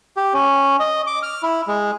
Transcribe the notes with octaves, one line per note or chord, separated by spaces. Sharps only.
G4
C#4
D#5
D6
F6
E4
G#3